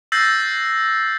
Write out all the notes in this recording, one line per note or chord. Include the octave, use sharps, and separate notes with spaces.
E6 F#6 G6 A6 A#6 C7